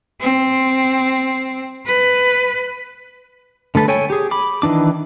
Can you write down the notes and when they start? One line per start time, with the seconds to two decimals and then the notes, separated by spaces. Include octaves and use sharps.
0.21 C4
1.87 B4
3.75 D3 A3 A4 B4
3.88 A4 C#5 G5 G#5
4.10 G4 G#4
4.31 B5 D6
4.62 D#3 E3 D4 D6